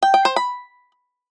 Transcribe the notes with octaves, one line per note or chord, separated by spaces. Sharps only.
G5
G5
C5
B5